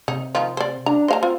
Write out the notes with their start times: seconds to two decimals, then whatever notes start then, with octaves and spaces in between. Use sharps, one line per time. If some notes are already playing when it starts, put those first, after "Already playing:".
0.08 C3 D#4
0.35 D#3 F3 F4
0.57 C5 D5
0.86 D4 A#5
1.08 C5 D#5 F5 A#5
1.23 C4 F4